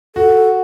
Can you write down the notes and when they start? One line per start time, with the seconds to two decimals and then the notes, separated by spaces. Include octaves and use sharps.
0.16 F#4 A4